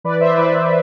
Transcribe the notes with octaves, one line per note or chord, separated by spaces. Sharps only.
E3 B4 D5
C5 E5
E3 B4 D5